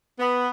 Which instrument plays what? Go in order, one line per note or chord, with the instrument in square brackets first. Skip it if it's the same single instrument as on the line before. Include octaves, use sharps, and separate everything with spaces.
[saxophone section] B3